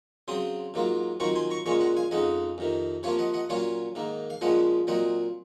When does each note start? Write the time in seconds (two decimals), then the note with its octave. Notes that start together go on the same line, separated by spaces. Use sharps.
0.28 C#3 F#3 C4 C6 D#6
0.74 G#2 F#3 A#3 F4
1.20 D#3 F#3 C4 F4 A#5 C#6
1.35 G#5 C6
1.50 A#5 C#6
1.66 A#2 G#3 C#4 F4 A#5 C#6
1.81 F#5 A#5
1.97 F5 G#5
2.11 F2 C#3 G#3 D#4 D#5 F#5
2.58 F2 C3 D#3
3.03 C3 F3 A#3 F4 C#5 F5
3.18 D#5 F#5
3.34 D#5 F#5
3.49 A#2 F#3 C#4 F4 C#5 F5
3.95 G#2 D#3 A#3
4.30 F5
4.41 A#2 F3 G#3 C#4 D#5 F#5
4.87 A#2 F#3 C4 D#5 F#5